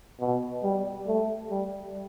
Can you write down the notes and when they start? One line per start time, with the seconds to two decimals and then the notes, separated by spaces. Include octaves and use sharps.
0.20 B2
0.63 G3
1.07 A3
1.50 G3